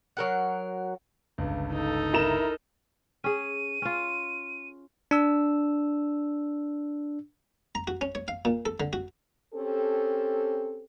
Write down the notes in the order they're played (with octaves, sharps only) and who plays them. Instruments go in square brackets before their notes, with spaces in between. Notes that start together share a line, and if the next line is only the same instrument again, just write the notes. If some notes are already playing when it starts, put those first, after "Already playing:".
[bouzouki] F#3 A#4 F#5
[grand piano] G1 C#2
[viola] D#4 A4
[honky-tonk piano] E4 A#5 E7 [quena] A#4
[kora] C#4 G#4 [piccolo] D#7
[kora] C#4 F4
[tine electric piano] D4 E6
[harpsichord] A#5
F#4
C#4
C#5
F5
A#2
A4
D3
F#4
[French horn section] C4 C#4 G4 A4